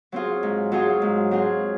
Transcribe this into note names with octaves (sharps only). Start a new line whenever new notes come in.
F#3 C4 F4 G#4
G#2
F#3 C4 F4 G#4
G#2
F#3 C4 F4 G#4